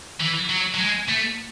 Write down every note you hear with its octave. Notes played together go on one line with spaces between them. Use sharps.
E3
F#3
F#3
G#3
A3